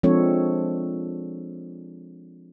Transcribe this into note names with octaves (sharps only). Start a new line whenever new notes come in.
F3 G#3 C4 D4 A4 C#5